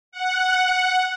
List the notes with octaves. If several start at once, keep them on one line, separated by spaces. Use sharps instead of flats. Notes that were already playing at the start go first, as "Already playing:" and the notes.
F#5